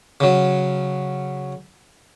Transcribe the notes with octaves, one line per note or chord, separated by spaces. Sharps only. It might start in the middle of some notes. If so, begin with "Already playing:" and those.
C#3 F#3